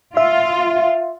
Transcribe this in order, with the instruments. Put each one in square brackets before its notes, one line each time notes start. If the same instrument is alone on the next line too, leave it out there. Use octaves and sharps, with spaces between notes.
[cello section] F4 [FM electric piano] E5